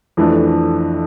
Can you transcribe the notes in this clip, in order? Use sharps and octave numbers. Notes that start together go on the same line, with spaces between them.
F2 E3 A3 D4